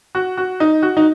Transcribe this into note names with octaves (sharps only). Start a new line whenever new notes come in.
F#4
F#4
D#4
F#4
D#4